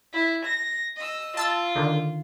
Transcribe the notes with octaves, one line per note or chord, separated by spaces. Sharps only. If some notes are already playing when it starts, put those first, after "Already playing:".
E4
A#6
D#5 E6
F4 A5 E6 A6
D3 D#3